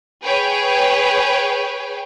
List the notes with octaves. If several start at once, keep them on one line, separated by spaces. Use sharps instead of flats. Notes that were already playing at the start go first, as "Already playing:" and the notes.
G#4 B4 C#5 G5